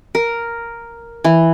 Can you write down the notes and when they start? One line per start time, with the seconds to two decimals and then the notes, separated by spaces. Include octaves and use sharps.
0.15 A#4
1.24 E3